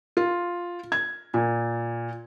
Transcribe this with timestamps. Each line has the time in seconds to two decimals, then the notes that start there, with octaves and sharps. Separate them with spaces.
0.17 F4
0.92 G#6
1.34 A#2